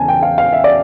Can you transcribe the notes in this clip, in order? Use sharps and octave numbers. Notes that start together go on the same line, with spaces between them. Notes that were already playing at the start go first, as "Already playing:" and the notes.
Already playing: E2 C#3 E3 G#5 A5
G5
F5
F5
E5
D5